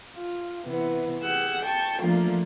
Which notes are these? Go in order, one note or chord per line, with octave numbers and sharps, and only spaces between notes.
F4
C3 E3 B3
G4 G#4 F#5 E6
G5 A5 C#6
F3 A3 A#3 D4 F4 A#4